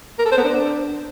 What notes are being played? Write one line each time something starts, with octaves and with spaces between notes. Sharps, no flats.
A#4
A4
C5
B3
D4